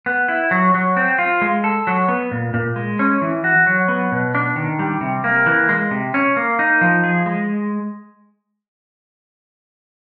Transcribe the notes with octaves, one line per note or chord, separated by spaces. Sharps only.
B3
E4
F#3
F#3
C4
F4
G#3
A4
F#3
B3
A#2
A#2
G#3
C#4
E3
F#4
F#3
B3
B2
D4
D#3
G3
C3
A#3
E3
G#3
C3
C#4
A#3
D#4
F3
G#4
G#3